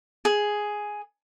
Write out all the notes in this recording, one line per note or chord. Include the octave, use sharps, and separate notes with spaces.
G#4